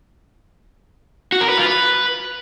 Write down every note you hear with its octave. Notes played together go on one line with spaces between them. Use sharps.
F#4
A#4
B4
F4
B4